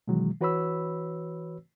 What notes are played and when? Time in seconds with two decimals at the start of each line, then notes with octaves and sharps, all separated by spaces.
0.08 B2 D#3 E3 F#3 G#3
0.40 E3 F#4 B4 C#5 B5 E6